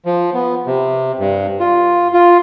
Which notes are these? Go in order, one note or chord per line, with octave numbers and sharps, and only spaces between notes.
F3
B3
C3
G2
F4
F4